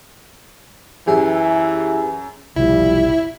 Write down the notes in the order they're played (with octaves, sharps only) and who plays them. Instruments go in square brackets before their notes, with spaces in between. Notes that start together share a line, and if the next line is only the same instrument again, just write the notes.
[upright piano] F#2 [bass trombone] E3 [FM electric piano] G4 G#4 E5
[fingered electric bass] F1 B1 B2 [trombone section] F3 G3 [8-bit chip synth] E4